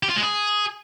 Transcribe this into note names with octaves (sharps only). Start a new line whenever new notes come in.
G4
F4
G#3
G#4